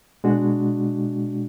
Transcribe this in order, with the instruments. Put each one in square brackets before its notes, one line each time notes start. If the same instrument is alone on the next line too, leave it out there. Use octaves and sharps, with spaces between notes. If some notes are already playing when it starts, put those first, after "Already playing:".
[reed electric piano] B2 G#3 D4 F#4